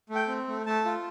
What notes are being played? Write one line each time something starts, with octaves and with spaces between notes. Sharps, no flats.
A3
G5
C4
A3
A3 A5
F4